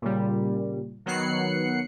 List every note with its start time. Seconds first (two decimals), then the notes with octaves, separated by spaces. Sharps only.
0.02 A#2 C#3 G3
1.06 D#3 F#3 B3 F#6 C7 C#7